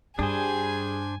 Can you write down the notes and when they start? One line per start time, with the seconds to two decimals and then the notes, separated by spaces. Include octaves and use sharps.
0.19 G2 G3 D4 G#4 C5 G#5